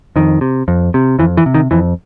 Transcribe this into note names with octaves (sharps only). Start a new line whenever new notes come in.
F2 D#3
C3
F2
C3
F2 E3
E3
C3
D#3
F2 E3